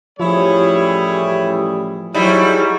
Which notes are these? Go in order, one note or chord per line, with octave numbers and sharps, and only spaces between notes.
A1 F3 G3 E4 G#4 C#5
G#2 F#3 G3 E4 C#5